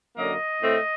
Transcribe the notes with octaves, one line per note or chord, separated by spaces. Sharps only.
F#2 D3 F#3 A#3 D#5
A2 A3 C4